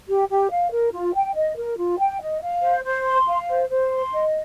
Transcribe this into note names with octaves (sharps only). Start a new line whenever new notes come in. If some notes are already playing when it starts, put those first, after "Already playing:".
G4
G4
F5
A#4
F4
G5
D#5
A#4
F4
G5
D#5
F5
C5
C5
C6
F5
C5
C5
C6
D#5